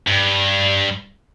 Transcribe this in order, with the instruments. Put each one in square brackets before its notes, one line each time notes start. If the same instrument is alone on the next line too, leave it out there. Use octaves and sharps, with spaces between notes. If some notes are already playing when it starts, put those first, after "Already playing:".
[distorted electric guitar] G2